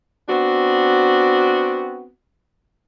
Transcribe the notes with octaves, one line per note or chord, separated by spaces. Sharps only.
B3 C4 D4 F#4